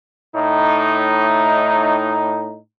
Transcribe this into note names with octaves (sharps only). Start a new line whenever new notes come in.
A2 D#4